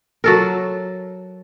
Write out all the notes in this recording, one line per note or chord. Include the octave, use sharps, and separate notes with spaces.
F#3 A4 A#4